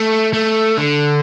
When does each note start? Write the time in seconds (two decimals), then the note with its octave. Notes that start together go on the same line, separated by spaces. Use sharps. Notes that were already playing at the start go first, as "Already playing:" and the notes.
Already playing: A3
0.33 A3
0.78 D3